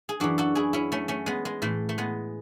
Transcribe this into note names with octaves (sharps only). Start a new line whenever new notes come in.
G#4
F#2 E3 D4 F#4
F#4 A4
E4 G#4
C#4 E4
A3 C#4
A3 C#4
G#3 B3
G#3
A2 E3 A3
A3
G#3 B3